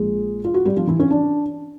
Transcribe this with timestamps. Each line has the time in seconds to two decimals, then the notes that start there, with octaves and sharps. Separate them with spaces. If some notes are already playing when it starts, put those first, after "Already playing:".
Already playing: A#1 A#2 F3 G#3 G#4
0.45 F4
0.54 F#4
0.65 G3 G4
0.77 F3 F4
0.87 E3 E4
0.99 C#4
1.10 D4